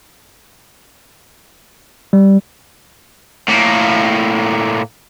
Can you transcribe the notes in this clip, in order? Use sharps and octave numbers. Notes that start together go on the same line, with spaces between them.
G3
A2 A#3